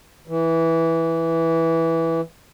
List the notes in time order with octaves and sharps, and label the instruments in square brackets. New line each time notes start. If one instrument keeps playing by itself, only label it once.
[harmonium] E3